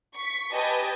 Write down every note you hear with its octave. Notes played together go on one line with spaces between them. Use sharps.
C#6 B6
G4 B4 D#5 G#5 A5